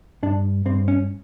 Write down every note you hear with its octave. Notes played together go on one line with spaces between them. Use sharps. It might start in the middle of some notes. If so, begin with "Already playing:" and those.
G2 D4
G2 C4
C#4